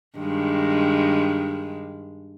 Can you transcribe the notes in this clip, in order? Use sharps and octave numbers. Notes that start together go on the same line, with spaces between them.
G2 D#3 G#3